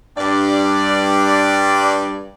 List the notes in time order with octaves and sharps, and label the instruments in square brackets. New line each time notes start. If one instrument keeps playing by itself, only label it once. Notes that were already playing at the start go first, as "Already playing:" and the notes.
[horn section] G2 D5